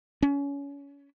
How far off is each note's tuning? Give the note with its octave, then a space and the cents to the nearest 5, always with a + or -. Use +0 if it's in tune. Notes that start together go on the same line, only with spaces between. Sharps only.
C#4 +25